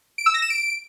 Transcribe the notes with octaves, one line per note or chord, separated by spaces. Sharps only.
D7
E6
A#6
E7
D7